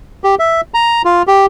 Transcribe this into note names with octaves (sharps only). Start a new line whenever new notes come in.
G4
E5
A#5
F4
G4